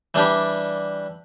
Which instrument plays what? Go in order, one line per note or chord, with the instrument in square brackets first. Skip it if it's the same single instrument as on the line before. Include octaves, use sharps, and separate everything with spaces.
[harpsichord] E3 G3 D4 G4